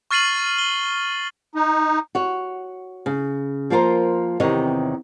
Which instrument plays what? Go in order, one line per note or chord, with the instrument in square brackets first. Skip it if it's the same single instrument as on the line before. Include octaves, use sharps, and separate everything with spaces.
[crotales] C#6 F6 A6 C7 D#7 F#7
G7
[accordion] D#4
[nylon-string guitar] F#4 C#5
C#3
F3 A#3 F4 A#4 C5
E2 C3 D#3 C4 C#5 D#5